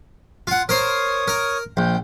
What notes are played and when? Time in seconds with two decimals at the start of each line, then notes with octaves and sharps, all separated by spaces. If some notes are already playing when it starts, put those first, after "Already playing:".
0.47 F4 F#5
0.69 A#4 C5 C#5 D#6
1.28 A#4
1.77 A#1 G5 G6